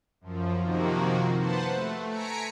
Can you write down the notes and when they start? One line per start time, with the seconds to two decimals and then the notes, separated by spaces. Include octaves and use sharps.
0.21 F#2 F3
0.62 C3 D#3 F3 A#3 F#4
1.39 B4 C5 F#5 A5
1.70 A3
2.10 G#5 A#5 B6 C#7 D7